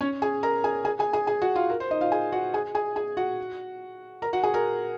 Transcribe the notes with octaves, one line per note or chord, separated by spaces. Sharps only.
C#4 C#5
G#4 G#5
A#4 A#5
G#4 G#5
G#4 G#5
G#4 G#5
G#4 G#5
G#4 G#5
F#4 F#5
F4 F5
A#4
C5
D#4 D#5
F4 F5
G#4 G#5
F#4 F#5
G#4 G#5
G#4 G#5
G#4 G#5
F#4 F#5
A#4 A#5
F#4 F#5
G#4 G#5
A#4 A#5